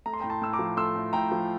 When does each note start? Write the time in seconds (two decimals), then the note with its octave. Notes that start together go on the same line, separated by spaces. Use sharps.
0.06 A3 A#5
0.14 C6
0.20 A2 G5 A#5
0.30 A5 C6
0.42 A2 E6
0.53 A#5 D6
0.59 F3
0.77 A3 C6 E6
0.96 A2
1.13 A2 G5 A#5
1.32 F3